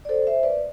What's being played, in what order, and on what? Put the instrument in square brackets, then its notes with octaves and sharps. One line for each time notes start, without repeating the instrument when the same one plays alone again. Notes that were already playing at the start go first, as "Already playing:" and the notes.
[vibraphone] D5
A4 C5
C5 E5
B4 D5